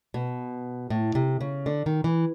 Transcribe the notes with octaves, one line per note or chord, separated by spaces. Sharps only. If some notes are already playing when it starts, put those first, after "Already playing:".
B2
A2
C3
C#3
D3
D#3
E3